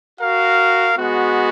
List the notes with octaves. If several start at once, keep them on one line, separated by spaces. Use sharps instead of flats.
F#4 A#4 F5
G#3 B3 F#4